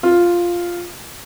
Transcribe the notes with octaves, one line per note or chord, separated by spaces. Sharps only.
F4